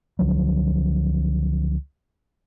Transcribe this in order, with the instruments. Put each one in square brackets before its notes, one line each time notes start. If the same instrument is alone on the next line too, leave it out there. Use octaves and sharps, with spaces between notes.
[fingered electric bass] C#2 D3 F3 F#3